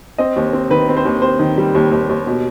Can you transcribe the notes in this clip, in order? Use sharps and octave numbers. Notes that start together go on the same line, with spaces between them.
C4 D#5
D#2
C4
D#3 B4
C4
C5
D#2
C4 C5
D#3
G3
D#2
D#2
D#2
B2